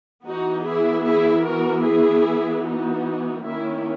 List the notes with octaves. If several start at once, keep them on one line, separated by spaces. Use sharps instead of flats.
E3 B3 D#4 F#4
E4 G#4
E4 G#4
F#4 A#4
E4 G#4
D#4 F#4
D#3 A#3 C#4 E4